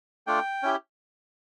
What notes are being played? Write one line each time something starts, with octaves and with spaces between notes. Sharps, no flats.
A3 D4 F4 G5
C#4 E4 G4